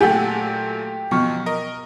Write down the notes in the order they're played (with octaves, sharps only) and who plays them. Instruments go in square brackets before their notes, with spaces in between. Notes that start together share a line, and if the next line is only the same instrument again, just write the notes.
[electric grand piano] A#2 F#3 A3 [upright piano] G4 [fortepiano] A4 F#5 G#5
[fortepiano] B2 C#6 F6 [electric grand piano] F3 F#3
[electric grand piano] A#4 D#5